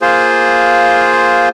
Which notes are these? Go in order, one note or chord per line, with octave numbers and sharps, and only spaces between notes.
A#3 F4 G#4 C5